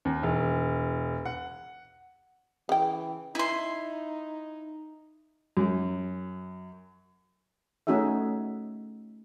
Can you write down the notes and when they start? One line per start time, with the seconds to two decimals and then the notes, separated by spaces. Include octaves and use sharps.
0.05 D#2
0.23 E1
1.25 F#5
2.69 C#3 E3 G5
3.35 D#4 E4 C6
5.57 F#2
7.87 A3 C#4 D#4 F#4 G#4 E5